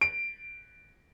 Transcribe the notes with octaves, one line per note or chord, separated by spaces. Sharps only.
D7